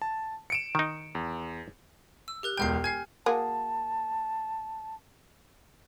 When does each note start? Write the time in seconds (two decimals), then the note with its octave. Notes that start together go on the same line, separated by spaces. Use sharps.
0.02 A5
0.50 C#7 D7 E7
0.75 D#3 D#4
1.15 E2
2.28 E6
2.43 G4 A#4 F#6
2.58 E1 C#2 G5 F6 G6 C7
2.84 G#5 F6 G#6 C7
3.26 A#3 F#4 G#4 A5